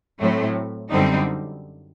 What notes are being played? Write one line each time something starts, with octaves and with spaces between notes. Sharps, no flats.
A2 F#3 A3 C4
F#2 D3 G3 C4 D#4